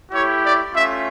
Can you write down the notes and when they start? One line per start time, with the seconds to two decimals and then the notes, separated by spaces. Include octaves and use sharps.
0.11 A3 E4 G4 C#5
0.42 D5
0.73 A3 C#4 F4 E5